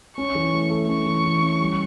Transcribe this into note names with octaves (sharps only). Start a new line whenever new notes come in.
C#4 C#6
E3
A3
A3
C#4 C#6
E3
E3
C#4
G3